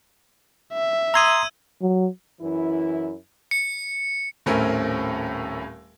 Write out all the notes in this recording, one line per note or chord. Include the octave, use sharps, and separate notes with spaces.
E5
A#5 C6 D#6 E6 G#6 D#7
F#3
F#2 E3 E4
C#7
D#1 A2 A3 C4 C#4 A#4